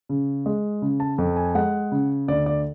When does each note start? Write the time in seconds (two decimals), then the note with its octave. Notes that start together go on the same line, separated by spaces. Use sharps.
0.09 C#3
0.46 G#3
0.82 C#3
1.00 A5
1.18 F2
1.36 G#5
1.55 G#3 F#5
1.92 C#3
2.28 D2 D5
2.46 D5